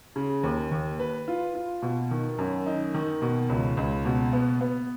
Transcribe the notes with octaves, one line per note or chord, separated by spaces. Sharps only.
C#3
D#2
D#2
B4
F4
F4
B2
D#3
F#2
D#4
D#3
B2
C#2
C#2
B2
B3
B3